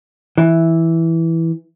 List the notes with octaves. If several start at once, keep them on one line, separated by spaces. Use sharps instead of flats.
E3